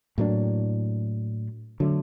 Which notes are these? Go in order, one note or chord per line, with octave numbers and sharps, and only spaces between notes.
A2 F#3 A#3 D4
D3 F#3 A3